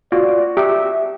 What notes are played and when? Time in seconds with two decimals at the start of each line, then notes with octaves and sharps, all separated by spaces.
0.12 F4 F#4 D5
0.57 G4 E5